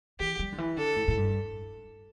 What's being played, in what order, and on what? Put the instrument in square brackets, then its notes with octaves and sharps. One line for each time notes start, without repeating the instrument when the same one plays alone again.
[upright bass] E3 [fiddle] G4
[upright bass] G3
D3
E3
[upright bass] D3 [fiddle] A4
[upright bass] A2
A2
G2